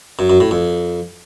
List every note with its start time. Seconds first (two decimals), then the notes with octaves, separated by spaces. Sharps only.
0.19 F#2
0.30 F#2
0.40 A2
0.51 F2